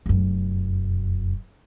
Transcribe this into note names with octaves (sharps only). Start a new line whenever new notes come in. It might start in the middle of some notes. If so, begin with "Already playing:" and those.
F1 F#2